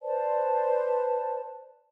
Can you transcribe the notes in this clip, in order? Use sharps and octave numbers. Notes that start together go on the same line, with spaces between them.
B4 C5 D5 A5